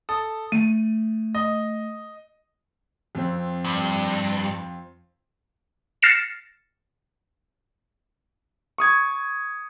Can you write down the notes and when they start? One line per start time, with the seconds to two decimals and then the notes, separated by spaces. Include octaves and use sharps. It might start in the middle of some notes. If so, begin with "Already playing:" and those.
0.09 A4 D#6
0.52 A3 D#7
1.35 D#5
3.15 F2 C4
3.65 G2
6.02 F6 A6 A#6 C7 C#7 E7
8.78 C#6 D#6 G#6